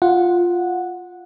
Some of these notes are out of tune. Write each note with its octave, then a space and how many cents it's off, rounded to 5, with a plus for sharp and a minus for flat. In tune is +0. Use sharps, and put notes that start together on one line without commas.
F4 +0 F#5 -10